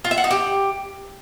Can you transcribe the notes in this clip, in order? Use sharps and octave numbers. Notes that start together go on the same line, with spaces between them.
F4
E5
F#5
D#4
G4